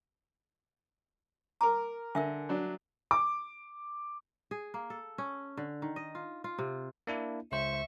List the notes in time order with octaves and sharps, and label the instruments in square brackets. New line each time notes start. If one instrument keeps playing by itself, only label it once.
[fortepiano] A#4 D6 [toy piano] A#5
[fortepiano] D3 [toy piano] A#4 E5 G#5
[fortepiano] F#3 D4
[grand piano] D6
[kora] G#4
A#3
A4
C#4
D3
D#3
D#5
F4
F4
C3
[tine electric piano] A#3 D4 E4
[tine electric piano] C#2 C5 [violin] E5 C#6